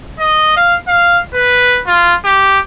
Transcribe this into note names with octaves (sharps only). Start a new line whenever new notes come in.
D#5
F5
F5
B4
F4
G4